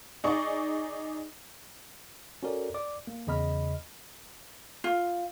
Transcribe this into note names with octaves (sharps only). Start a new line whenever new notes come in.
D#4 G#4 D5 C#6
C#4 F#4 A4 A#4 D5
D5 D6
A#3
E2 C#3 D#5 B5 F6
F4